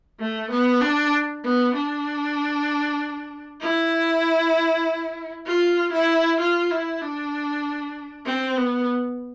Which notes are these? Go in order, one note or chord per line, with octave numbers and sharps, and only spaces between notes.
A3
B3
D4
B3
D4
E4
F4
E4
F4
E4
D4
C4
B3